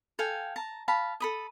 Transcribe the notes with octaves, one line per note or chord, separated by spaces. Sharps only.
A4 F5 G5 G#5
A5 A#5
F5 A5 B5
A4 B5 D#6